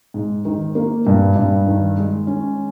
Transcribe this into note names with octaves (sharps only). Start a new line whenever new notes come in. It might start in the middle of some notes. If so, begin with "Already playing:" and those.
G#2
D#3
A#3
G2
G2
D#3
G#3
C#4